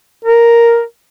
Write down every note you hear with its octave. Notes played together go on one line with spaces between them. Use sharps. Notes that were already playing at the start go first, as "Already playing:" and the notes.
A#4